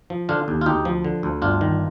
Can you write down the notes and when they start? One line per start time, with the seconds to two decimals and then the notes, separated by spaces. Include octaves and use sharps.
0.10 F3
0.29 D3 D4 F4
0.48 D#2
0.61 F4
0.66 D2 D#4 G4
0.85 F3
1.04 D3
1.23 D2
1.42 G1 D4 F4
1.61 D#3